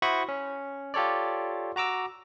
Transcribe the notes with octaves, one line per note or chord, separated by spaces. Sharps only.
E4 F#4 C5 B5 C#6 D#6
C#4
F4 G4 A4 C#5 D5
F#4 A#5 D6 E6